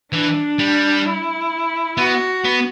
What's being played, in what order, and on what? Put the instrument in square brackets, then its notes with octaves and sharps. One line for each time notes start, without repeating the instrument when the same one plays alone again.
[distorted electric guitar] E3 [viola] D4
[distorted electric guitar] G3
[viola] E4
[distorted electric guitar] B3 [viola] F#4
[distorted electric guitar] B3